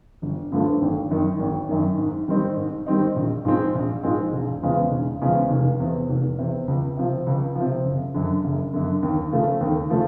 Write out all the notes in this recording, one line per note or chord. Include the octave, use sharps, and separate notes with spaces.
G1
G2 D3 F3 A3
G#1
F#2 D#3
G#1
F#2 D#3
G#2
D#3 G3 C4 D#4
G#2
D#3 G3 C4 D#4
A#1
G#2 F3 G#3 C4
A#1
G#2 F3 G#3 C4
E1
E2 C#3 F3 G#3
E1
E2 C#3 F3 G#3
F1
E2 C3
F1
E2 C3
C#2
C3 F3
C#2
C3 F3
F#1
F#2 D3
F#1
F#2 D3
D#2
C#3 F3 A3
D#2
C#3 F3 A3